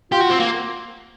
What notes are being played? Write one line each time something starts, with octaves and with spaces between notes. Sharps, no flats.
F4 G4
F#4
C4
A#3